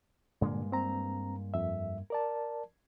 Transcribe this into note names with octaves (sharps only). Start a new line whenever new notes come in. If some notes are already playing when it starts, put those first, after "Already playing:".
G2 A#2 D3 G#3 A#3
C4 A#5
F2 E5
A#4 D5 A5